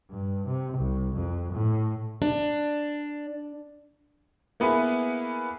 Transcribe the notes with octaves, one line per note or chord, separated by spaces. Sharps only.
G2
C3
C2
F2
A2
D4
A#3 B3 E4 G#4 B4